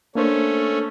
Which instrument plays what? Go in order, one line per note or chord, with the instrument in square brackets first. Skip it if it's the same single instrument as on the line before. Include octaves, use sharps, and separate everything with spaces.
[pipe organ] A3 C#4 [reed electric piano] A#3 D4 C5